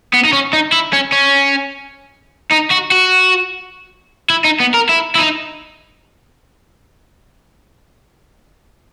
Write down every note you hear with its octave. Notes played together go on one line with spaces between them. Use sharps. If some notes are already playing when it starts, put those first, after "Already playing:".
B3
D#4
C#4
D#4
E4
C#4
C#4
D#4
F#4
F#4
E4
D#4
B3
A#4
E4
E4
D#4